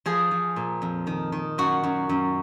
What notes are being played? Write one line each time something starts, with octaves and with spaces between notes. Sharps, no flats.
F3 G#4
F3
A#2
F2
D#3
D#3
F#2 F#4
F#2
F#2